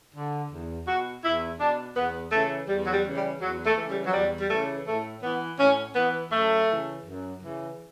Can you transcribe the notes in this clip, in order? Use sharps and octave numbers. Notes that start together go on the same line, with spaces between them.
D3
E2
B2 F#4
E2 E4
B2 D4
E2 B3
C#3 E3 A3
E2 G3
F#3
G3
C#3 E3
G3
E2 F#3
A3
C#3 E3
G3
F#3
E2 G3
G3
C#3 E3 A3
A2 A3
E3 B3
A2 C#4
E3 B3
F#2 A3
C#3 E3
F#2
C#3 E3